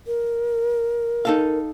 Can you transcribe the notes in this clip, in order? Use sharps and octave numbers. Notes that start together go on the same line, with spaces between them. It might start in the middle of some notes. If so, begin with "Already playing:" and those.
A#4
D#4 A4 F5